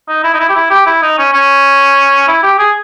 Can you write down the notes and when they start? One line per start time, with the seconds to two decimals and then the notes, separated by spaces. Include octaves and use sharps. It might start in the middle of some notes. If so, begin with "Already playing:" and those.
0.08 D#4
0.24 E4
0.34 D#4
0.39 E4
0.49 G4
0.56 E4
0.70 G4
0.86 E4
1.03 D#4
1.18 C#4
1.33 C#4
2.28 E4
2.43 G4
2.59 G#4